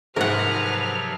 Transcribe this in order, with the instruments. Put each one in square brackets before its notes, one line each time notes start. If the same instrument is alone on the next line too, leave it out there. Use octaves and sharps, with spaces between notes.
[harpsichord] G#2 [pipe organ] C3 F3 F#3 [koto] A#4 F#5 [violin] B4 F6